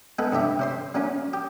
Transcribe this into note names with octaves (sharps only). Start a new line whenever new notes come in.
G#3 B3 A4 B4
G2 C3 G4 E5
C3 C5 C6
F#3 A#3 C#4 F4
G4